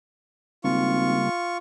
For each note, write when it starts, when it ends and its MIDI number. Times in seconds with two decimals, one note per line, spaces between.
0.64 1.21 32
0.64 1.29 49
0.64 1.29 55
0.64 1.29 58
0.64 1.57 65
0.64 1.57 85